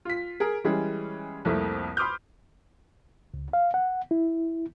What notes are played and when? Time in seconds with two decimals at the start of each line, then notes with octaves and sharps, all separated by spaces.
0.05 F4 B6
0.40 G#4 A#4
0.64 E3 G3 G#3 C#4 G#4
1.45 C2 F2 A3 A#3
1.97 B5 C6 D6 D#6 F6 G6
3.34 C#2
3.53 F5
3.74 F#5
4.11 E4